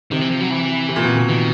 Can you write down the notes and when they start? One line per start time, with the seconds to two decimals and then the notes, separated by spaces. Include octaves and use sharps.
0.11 C3 D#3
0.21 E3
0.30 F3
0.41 F#3
0.50 E3
0.89 C3
0.96 A#2
1.02 B2
1.16 B2
1.28 D#3